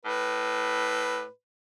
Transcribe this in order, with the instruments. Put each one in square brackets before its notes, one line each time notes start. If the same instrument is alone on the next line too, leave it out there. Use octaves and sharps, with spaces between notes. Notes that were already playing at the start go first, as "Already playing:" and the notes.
[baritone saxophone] A2 [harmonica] B4